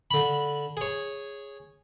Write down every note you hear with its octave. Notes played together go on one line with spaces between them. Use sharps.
D3 B5
G#4 C#5